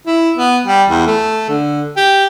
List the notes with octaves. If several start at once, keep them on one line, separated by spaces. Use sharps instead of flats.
E4
B3
G3
E2
A3
D3
G4